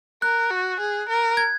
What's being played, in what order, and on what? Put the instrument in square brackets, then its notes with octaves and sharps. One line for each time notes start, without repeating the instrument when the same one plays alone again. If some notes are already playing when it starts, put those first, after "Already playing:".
[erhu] A#4 [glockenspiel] F#6
[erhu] F#4
G#4
A#4
[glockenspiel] G#6